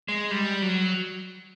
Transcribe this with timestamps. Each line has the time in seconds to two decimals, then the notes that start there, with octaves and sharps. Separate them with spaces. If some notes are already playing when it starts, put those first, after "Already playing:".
0.08 G#3
0.31 G3
0.62 F#3